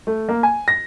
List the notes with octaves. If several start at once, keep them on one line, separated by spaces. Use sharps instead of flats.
A3
A#3
G#5
A#6